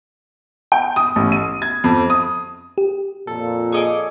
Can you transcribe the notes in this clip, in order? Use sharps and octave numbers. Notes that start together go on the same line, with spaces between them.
G5
D#6
A1
D#7
G#6
F2
D#6
G4
F2 A#2 A4
G#4 C#5 D#5 D6